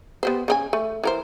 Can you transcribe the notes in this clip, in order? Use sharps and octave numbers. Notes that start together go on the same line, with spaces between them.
B3 G4 C5
C#3 D#4 G#5
A3
E3 A#4 C5